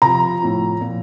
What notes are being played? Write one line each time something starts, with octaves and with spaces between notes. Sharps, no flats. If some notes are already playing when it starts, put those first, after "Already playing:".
C3 F3 A#5
A2 F3
A#2 F3